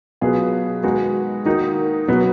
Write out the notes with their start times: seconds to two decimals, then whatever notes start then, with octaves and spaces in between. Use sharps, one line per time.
0.21 B2 F#3 B3 F4 G#4
0.83 D#3 G#3 B3 D#4 F#4
1.46 D#3 A#3 D#4 F#4
2.08 B2 F#3 B3